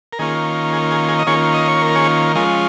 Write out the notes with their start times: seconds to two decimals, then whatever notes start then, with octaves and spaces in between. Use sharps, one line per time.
0.13 A#4
0.19 D#3 A#3 C#4 F4 G#4
0.73 G#4
0.91 G#4
1.09 G#4
1.19 D#5
1.27 D#3 A#3 C#4 F4 G#4 C#5
1.54 D#5
1.68 C#5
1.82 A#4
1.95 G#4 C#5
2.35 F3 G#3 C#4 F4 A#4 D#5